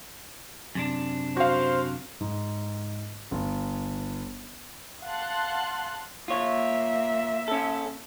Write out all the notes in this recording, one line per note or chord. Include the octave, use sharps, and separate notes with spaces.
F#2 C3 D4
F#4 C5 F5
G#2
G1
F5 F#5 A5 C6 F#6
A#3 F4 C#5 E5
C#4 A4